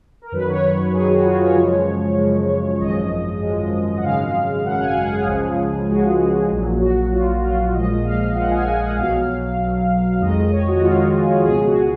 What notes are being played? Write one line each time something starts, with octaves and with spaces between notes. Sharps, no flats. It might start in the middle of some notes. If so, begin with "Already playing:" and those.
A#4
F#2 D#3 F#3 B4
C#5
B4
F#2 D#3 F#3 G#4
F#4
F4
C#5
F#2 C#3 F3 G#3
F#2 C#3 F3 G#3
G#1 F#2 F3 G#3 D#5
G#1 F#2 F3 G#3
F#5
G#1 F#2 C#3 G#3 F5
G#1 F#2 C#3 G#3 F#5
G#5
F#5
G#4
C#2 C#3 F3 G#3
C#2 C#3 F3 G#3 F#4
A#1 A#2 F#3
F#4
A#1 A#2 F#3 F4
F4
A#1 A#2 F3 G#3 D#5
F5
A#1 A#2 F3 G#3 F#5
G#5
G#5
F#5
B1 B2 F#3 F5
B1 B2 F#3
F2 D#3 G#3 D#5
D#5
C#5
F#4
F2 D#3 G#3 F4
G#4
C#2 B2 G#3 G#4
F#4